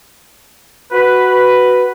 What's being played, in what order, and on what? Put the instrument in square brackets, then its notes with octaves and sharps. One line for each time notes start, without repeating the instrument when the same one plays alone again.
[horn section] F#4 B4